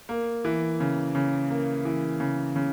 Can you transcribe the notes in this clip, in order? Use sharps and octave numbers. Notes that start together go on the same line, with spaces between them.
A#3
E3
C#3
C#3
A#3
E3
C#3
C#3